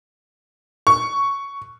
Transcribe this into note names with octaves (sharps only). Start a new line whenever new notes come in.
C#6